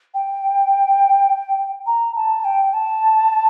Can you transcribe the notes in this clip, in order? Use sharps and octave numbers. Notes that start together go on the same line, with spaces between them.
G5
A#5
A5
G5
A5